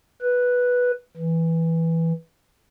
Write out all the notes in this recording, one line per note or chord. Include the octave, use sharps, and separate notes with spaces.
B4
E3